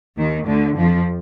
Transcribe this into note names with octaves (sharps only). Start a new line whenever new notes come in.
D#2 D#3
D2 D3
F2 F3